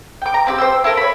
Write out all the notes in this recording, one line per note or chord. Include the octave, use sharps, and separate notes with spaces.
G5 D6
A#5
C4 E4 G4
C5 G5 E6
E4 A4 A#4
C#5 B5